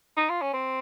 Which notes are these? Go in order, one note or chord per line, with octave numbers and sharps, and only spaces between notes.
D#4
F4
C#4
C4